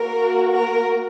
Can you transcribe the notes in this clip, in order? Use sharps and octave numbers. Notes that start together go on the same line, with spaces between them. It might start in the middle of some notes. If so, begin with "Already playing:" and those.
Already playing: A#3 F#4 A#4
A#4